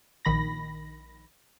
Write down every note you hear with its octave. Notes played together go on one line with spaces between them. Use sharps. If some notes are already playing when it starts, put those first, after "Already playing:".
A#1 D#3 B5 A#6